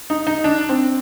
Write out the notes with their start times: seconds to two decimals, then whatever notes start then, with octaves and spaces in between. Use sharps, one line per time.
0.10 D#4
0.27 D#4
0.44 D4
0.69 C4